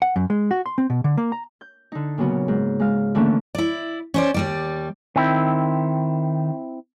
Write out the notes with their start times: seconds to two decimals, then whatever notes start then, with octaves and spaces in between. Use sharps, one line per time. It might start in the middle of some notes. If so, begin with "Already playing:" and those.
0.02 F#5
0.16 F#2
0.30 G#3
0.51 F#4
0.66 C6
0.78 C4
0.90 B2
1.04 D3
1.17 A#3
1.32 A#5
1.61 G6
1.92 D3 D#4
2.18 A#2 C#3 F#3 B3
2.48 G#2
2.80 G#3 F5
3.15 D3 E3 A3 A#3 C4 C#4
3.55 E4 D5
4.14 C#4 C5 D5
4.34 D#2 G3 D5
5.16 D#3 C4 E4